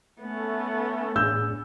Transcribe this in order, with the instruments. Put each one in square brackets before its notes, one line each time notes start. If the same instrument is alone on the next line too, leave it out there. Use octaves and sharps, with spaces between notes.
[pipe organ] A3 [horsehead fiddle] B3 C#4
[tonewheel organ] A2 D4 G#4 [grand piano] E6 G6